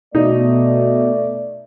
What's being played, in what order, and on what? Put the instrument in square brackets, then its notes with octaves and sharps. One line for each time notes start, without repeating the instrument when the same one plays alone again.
[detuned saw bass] B2 [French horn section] A3 D5 [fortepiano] D#4